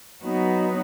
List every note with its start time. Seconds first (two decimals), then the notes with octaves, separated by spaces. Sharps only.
0.24 F#3 B3 D#4 F#4 B4